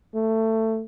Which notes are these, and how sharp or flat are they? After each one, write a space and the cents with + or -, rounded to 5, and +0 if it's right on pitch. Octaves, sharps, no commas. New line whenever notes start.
A3 +15